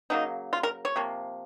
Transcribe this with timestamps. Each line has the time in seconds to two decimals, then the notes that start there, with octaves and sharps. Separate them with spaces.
0.10 C#3 F#3 A#3 D#4
0.53 F4
0.63 A#4
0.85 C#5
0.96 C3 F3 A#3